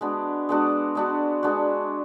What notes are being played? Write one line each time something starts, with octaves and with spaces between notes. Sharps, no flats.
G#3 B3 D4 F#4
G#3 B3 D4 F#4
G#3 B3 D4 F#4
G#3 B3 D4 F#4